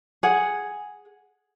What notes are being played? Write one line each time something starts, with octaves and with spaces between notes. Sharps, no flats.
G#4 F#5